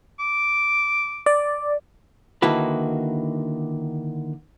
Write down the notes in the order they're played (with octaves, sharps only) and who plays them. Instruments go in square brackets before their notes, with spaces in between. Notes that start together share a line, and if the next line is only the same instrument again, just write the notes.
[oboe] D6
[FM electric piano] D5
[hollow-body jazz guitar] D3 D#3 A#3 E4 F#4 B4